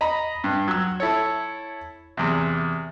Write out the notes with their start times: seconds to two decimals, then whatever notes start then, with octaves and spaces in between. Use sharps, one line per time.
0.01 D#5 A#5 B5
0.44 G2
0.68 F#3 E6
1.00 E4 A4 C#5
2.17 E2 C3